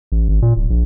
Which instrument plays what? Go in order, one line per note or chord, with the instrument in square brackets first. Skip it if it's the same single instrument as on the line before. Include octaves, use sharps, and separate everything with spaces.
[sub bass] A1
G#1
A#2
D1
A#1